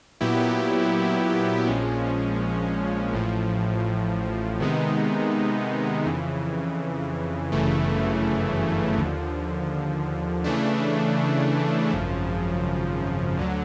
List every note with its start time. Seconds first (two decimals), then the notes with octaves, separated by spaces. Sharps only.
0.21 A#2 F#3 B3 E4 G4
1.67 A#1 A#2 F3 G#3 C#4
3.13 A1 A2 F3
4.60 C3 D#3 G#3 B3 D#4
6.06 F2 C#3 E3
7.52 G1 F#2 C#3 E3 A3
8.98 D#2 D3 F3
10.44 C#3 E3 A3 D4
11.91 G#1 F#2 C#3 F3
13.37 D2 D3 F#3